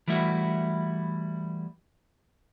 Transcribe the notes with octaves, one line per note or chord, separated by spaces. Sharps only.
E3 G3 A3 E4 F#4